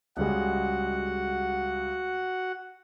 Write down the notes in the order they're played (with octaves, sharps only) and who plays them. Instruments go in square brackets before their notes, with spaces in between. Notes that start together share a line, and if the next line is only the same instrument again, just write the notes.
[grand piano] C#2 G3 G#3 [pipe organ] F#4 F#5